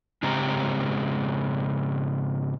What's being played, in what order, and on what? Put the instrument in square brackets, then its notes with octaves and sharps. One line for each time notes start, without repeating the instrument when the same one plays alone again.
[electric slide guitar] G#2 C#3 G#3 C4 G4 A#5